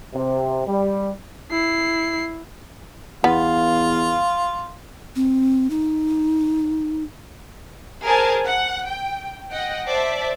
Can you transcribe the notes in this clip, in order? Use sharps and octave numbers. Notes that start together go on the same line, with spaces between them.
C3
G3
E4 C7
E2 B3 F4 F5
C4
D#4
G#4 A#4 C5 G#5 A5
F#5
G5
D#5 F#5 G5
C5 D5 E5 A5